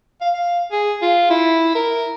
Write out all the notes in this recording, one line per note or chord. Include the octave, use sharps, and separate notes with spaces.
F5
F5
G#4
F4
E4
A#4